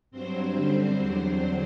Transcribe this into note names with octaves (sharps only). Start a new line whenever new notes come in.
G2 F#3 C4 C5
F#2 D3 G3 C4 C5
E2 D3 F#3